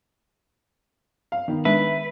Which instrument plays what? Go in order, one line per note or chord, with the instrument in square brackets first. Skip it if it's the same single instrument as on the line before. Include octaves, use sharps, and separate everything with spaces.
[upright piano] F5
D#3 B3
[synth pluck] G#3 D4 [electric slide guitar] B4 [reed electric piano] E5